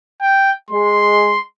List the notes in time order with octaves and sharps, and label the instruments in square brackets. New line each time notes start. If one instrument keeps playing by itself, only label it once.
[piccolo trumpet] G5
[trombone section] G#3 [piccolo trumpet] C6